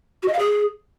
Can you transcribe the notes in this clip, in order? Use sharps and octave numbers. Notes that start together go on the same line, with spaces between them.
F#4
D#5
F5
G#4